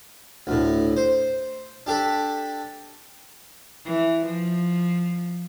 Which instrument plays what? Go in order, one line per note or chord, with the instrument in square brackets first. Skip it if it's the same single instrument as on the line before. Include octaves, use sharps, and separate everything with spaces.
[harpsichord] D2 A2
C5
D4 G4 A4 B5
[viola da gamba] E3
F3